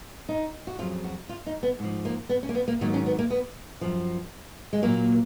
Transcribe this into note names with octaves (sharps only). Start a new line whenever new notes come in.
D#4
F#4
F2 C#3 F#3 F4
F#4
F4
D#4
B3
G#2 F3
A#3
B3
C#4
A#3
B3
A#3
G#2 D#3 F#3 A#3
C#4
B3
A#3
B3
F#2 F3
G#3
A#2 F#3 A#3